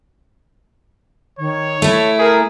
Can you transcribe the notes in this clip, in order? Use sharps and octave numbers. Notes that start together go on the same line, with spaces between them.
D#3 C#5
A3 E4 E5
G#4 A#4